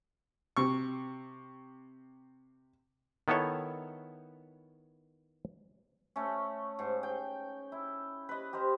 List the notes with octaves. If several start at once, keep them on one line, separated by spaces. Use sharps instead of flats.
C3 C#6
D#3 B3 E4 A4 C#5
A3 C#4
G#2
G5
E4
B4 D#5
G4 A#4 C5 D#5